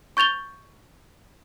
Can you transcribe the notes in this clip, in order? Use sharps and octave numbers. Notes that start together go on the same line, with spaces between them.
C#6 G6 A6 F7 G7